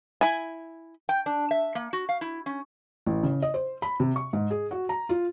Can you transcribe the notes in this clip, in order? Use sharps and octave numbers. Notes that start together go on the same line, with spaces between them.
E4 G#5
G5
D4
E5
A#3
F#4
F5
E4
C#4
A1
C#3
D#5
C5
B5
C3
C#6
G#2
G#4
F#4
A#5
F4